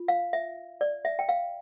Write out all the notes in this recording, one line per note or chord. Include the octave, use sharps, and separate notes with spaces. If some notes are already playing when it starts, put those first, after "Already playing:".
Already playing: F4
F5
E5
D5
E5
G5
F5